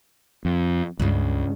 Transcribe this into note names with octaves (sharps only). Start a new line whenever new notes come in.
F2
C#2 G2 C#3